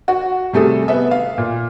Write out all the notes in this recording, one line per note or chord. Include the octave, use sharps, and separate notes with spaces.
F#4
C3 G3 A3 G#4 A4
B3 E5
F5
A#2